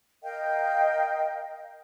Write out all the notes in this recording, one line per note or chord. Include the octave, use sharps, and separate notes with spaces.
A#4 D#5 F5 G5